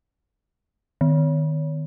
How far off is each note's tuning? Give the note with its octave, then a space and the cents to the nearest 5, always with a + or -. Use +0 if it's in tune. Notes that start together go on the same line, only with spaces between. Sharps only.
D#3 -15